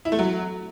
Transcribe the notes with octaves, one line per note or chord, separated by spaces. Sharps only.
E4
A3
F#3